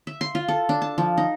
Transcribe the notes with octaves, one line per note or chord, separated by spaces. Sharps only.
E5
C6
F4
A4
D4
A5
F3
D#4